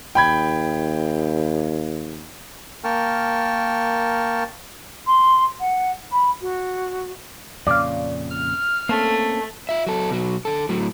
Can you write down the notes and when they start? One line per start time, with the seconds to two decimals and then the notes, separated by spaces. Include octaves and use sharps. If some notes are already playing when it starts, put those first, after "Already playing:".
0.15 D#2 G5 B5 G#6
2.84 A#3 A#4 G5 A5 C#6 F6
5.06 C6
5.60 F#5
6.12 B5
6.41 F#4
7.67 F2 A#2 C#3 D5 F5
8.30 F6
8.89 A3 A#3 C4 C#4
9.69 F4 E5
9.87 F#3 A4
10.10 B2 F#3
10.45 D3 A4
10.69 A2 F#3